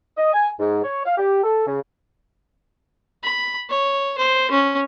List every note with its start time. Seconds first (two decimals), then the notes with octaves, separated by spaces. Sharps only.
0.18 D#5
0.33 G#5
0.59 G#2
0.84 C#5
1.06 F5
1.18 G4
1.44 A4
1.67 C#3
3.23 B5
3.69 C#5
4.18 C5
4.51 C#4